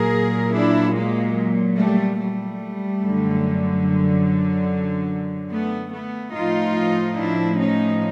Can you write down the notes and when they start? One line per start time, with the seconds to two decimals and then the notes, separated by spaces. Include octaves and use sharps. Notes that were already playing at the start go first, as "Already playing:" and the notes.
Already playing: A#2 F#3 G#4 A#4
0.53 D4 E4
0.95 G#3 A#3
1.77 G3 A3
2.20 G3 A3
3.03 F#2 D3 F#3
5.51 A3 B3
5.92 A3 B3
6.34 A2 F3 D#4 F4
7.16 D4 E4
7.58 C#4 D#4